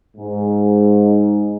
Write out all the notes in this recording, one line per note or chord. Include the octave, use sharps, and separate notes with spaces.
G#2